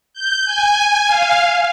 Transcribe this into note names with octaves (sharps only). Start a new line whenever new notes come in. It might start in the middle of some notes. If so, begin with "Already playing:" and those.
G6
G#5
F5